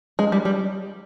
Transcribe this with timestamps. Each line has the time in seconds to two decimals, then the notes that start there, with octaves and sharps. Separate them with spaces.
0.19 G#3
0.32 G3
0.45 G3